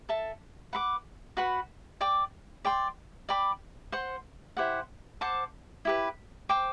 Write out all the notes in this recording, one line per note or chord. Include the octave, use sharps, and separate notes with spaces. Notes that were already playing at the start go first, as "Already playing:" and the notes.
A4 E5 A5
B4 F#5 B5 D6
F#4 B4 F#5 B5
D5 G5 D6
D5 G5 C6
D5 G5 B5 D6
C5 F#5 C6
E4 G4 C5 F#5
C5 F#5 A5 D6
E4 G4 B4
C5 G5 D6